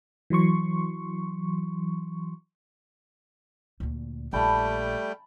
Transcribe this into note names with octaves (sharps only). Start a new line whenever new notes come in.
E3 F#3 C6 C#6
D2 A#2
A#1 G3 A3 G5 A5 B5